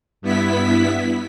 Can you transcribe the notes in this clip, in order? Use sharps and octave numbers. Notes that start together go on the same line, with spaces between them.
G2 B3 E4 B6